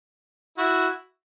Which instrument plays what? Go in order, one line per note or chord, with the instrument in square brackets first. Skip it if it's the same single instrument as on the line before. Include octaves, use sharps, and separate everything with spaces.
[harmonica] E4 F#4